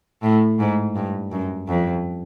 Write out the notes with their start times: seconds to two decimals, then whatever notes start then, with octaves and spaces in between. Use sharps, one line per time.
0.23 A2
0.59 G#2
0.96 G2
1.32 F#2
1.68 F2